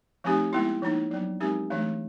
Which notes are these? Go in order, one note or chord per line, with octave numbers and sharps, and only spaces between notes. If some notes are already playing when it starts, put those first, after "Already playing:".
F3 A3 C4 D#4 G4
G#3 B3 E4
F3 A#3 D#4
F#3 B3 D4
G#3 C4 D#4 G4 A#4
E3 A3 D4